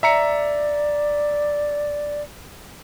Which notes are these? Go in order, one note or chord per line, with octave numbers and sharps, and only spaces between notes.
D5 E5 A#5 C#7